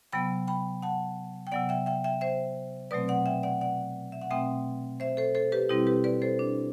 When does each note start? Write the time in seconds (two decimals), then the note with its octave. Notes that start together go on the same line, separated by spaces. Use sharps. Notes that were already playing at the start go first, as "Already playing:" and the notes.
0.12 C3 F#3 B3 G5 B5
0.48 G5 B5
0.82 F#5 A5
1.47 G5
1.52 C3 F#3 B3 D5 F#5
1.69 E5 G5
1.86 E5 G5
2.04 E5 G5
2.21 C5 E5
2.91 B2 F#3 A3 C4 B4 D5
3.08 D5 F#5
3.26 E5 G5
3.43 D5 F#5
3.61 D5 F#5
4.12 E5
4.21 F#5
4.31 B2 A3 C4 E5 G5
5.00 C5 E5
5.17 A4 C5
5.35 A4 C5
5.52 G4 B4
5.69 B2 G3 C4 E4 G4
5.87 G4 B4
6.04 B4 D5
6.22 A4 C5
6.39 D4